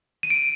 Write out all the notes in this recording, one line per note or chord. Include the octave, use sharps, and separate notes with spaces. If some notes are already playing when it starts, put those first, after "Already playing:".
D#7
D7